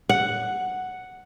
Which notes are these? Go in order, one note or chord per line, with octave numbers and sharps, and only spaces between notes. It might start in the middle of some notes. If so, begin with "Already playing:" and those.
F#5